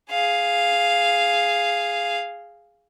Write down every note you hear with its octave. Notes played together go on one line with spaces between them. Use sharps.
G#4 F5